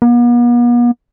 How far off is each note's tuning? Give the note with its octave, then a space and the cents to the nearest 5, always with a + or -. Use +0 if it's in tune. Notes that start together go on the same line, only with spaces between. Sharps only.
B3 -45